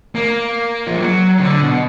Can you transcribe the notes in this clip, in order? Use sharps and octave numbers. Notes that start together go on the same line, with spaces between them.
A#3
F3
F#3
D3
B2